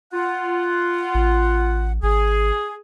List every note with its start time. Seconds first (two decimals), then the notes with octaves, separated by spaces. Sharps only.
0.13 F4 F#5
1.15 A1
2.03 G#1 G#4